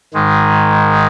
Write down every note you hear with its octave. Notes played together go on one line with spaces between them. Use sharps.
G#2 D#3 G#3